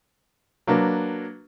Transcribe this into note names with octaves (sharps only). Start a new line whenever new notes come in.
F#3 A#3 D4 B4